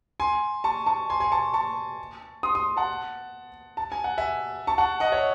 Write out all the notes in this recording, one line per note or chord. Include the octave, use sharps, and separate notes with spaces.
G#5 C6
A5 C#6
A5 C#6
G#5 C6
G#5 C6
A5 C#6
A5 C#6
C6 D#6
C6 D#6
F#5 A5
A5
G#5
F#5
E5 G#5
A5 C#6
F#5 A5
D#5 F#5
C#5 E5